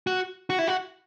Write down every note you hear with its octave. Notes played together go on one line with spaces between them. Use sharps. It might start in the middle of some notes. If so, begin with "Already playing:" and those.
F#4
F#4
E4
F#4